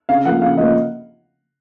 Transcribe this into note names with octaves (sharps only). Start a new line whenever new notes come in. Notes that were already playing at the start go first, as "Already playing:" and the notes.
C#3 F5
F3 A#3 F#5
C#3 F5
F3 A#3 D#5